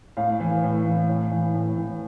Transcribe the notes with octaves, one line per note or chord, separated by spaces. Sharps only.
A2 F5
E3
A2
E3
A2
E3
A2
E3